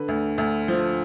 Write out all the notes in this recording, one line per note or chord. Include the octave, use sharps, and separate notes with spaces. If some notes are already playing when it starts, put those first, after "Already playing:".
Already playing: D3 B4
D2
D2
F3